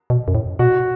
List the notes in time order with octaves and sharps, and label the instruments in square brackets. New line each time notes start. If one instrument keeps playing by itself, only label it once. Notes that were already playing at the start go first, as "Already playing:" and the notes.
[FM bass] B2
F#2
A2
[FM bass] B2 [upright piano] F#4